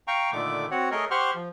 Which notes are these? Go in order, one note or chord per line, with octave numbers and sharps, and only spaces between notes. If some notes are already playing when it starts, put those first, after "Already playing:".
F5 G5 A#5 C#6
A#2 D3 D#3 A3 D6
C4 F#4 C#5 F#5
A3 G#4 A#4 C#5 D#5
G4 C5 F#5 C6 C#6 F6
F3